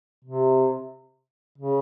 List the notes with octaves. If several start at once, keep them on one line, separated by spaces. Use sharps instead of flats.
C3
C#3